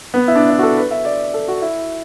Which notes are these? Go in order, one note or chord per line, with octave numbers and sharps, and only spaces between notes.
B3
E4
D4
E4
F#4
A4
B4
E5
D5
A4
F#4
E4